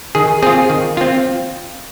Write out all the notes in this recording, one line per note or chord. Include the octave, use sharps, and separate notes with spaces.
D#3 G#4
C4 F4 G#4
D#3
C4 F4